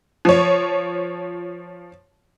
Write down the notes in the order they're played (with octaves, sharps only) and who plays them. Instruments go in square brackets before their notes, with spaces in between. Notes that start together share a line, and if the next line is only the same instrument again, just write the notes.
[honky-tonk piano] F3 C#5